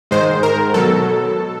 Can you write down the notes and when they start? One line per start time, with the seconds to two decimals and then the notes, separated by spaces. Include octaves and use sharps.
0.11 G#2 D#3 G#3 C5
0.43 A#4
0.74 B2 F#3 A4